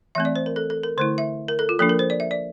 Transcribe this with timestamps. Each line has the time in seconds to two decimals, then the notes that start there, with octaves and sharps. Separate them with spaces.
0.15 E3 A3 C4 E5
0.25 D5
0.36 C5
0.46 A#4
0.56 A4
0.70 A4
0.83 A#4
0.98 D3 A3 E4 C5
1.18 E5
1.48 A#4
1.59 A4
1.69 F4
1.79 F3 A#3 D4 A4
1.89 A#4
1.99 C5
2.10 D5
2.20 E5
2.31 D5